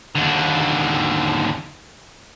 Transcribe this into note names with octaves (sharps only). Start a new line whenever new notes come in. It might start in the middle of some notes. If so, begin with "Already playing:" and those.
D#2 D3